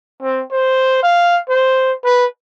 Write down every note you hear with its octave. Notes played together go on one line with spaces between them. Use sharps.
C4
C5
F5
C5
B4